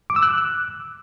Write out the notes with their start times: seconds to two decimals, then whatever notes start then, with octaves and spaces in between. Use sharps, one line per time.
0.10 D6
0.16 E6
0.23 F#6